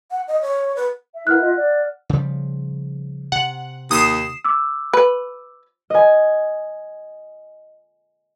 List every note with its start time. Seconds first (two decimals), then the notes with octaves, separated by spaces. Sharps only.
0.11 F#5
0.28 D#5
0.42 C#5
0.76 B4
1.14 E5
1.27 E4 A#4 B4 F#5 F6 F#6
1.41 F4 D#5 E5
1.55 D5
2.09 C#3 F3 G3
3.32 C3 F#5
3.91 D#2 D#6 C7 E7
4.45 D6 E6
4.93 B4
5.90 D#5 G#5